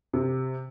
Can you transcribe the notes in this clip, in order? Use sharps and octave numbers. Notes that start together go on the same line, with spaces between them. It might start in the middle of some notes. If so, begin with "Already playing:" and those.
C3